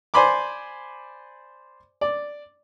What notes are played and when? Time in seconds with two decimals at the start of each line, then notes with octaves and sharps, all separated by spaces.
0.14 C5 D5 G#5 B5 C6 D6
2.01 D5